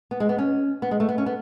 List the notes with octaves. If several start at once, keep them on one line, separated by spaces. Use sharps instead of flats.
B3
G#3
B3
C#4
B3
G#3
A3
B3
C#4
B3